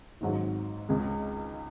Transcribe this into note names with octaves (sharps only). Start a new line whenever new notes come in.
G#1 G#2 F#3
C#2 C#3 G#3